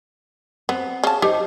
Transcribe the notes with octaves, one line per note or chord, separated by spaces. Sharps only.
B3 C4
C#3 A5
D#4 G4 C5